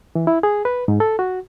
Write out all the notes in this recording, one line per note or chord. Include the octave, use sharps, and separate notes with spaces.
E3
E4
G#4
B4
G#2
A4
F#4